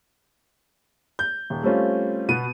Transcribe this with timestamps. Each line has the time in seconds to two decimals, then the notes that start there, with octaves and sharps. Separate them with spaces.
1.19 G6
1.50 D#1
1.63 G3 A3 C4 C#4 F4
2.29 B2 B3 D#7